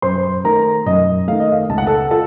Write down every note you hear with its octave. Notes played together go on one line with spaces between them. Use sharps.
F#2 C5 C6
D#3 A3 A#4 A#5
F#2 D#5
D#3 A3 F5
D#5
F5
C#2 A5
F#5
A4 A5
F4 A4 A5